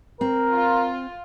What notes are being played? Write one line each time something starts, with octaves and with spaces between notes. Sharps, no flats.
C4 A#4
F4